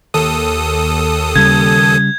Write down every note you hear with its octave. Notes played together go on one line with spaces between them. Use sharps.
D#2 A4 D#6
C#3 G3 G#6